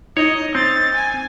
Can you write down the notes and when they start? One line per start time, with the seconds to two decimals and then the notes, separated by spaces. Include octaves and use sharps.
0.17 D#4 C#5 D#5
0.55 C4 A6
0.94 G#5